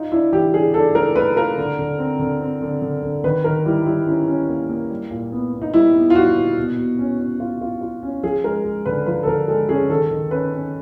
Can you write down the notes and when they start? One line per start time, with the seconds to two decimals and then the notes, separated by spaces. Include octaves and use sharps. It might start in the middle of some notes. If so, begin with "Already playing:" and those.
Already playing: D#4 F4
0.11 D4 E4
0.33 E3 G4
0.53 D4 G#4
0.74 D4 A4
0.95 A3 A#4
1.15 A3 B4
1.36 F4 A#4
1.58 D3
1.79 D3
1.99 C4
2.20 D3
2.40 C4
2.62 D3
2.82 D3
3.03 D3
3.24 D#3 B4
3.44 D#3 A#4
3.66 G3 E4
3.86 G3 E4
4.07 C#4 E4
4.27 C#4
4.49 A#3
4.70 A#3
4.91 G3
5.11 A#2
5.32 B3
5.53 B3
5.62 D#4
5.74 G3 E4
5.95 B3
6.10 F4
6.15 G3 F#4
6.36 A#2
6.57 B2
6.78 B2
6.99 C#4
7.19 C#4
7.40 F4
7.61 F4
7.81 F4
8.03 C#4
8.23 F3 G#4
8.44 G#3 A#4
8.65 G#3
8.86 D3 B4
9.06 F3 B4
9.23 A4
9.27 D3 A#4
9.48 G#3 A4
9.69 C#4 G#4
9.89 D#3 A4
10.11 D#3
10.31 C#4 B4
10.53 C#4